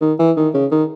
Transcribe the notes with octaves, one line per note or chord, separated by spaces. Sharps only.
D#3
E3
D#3
C#3
D#3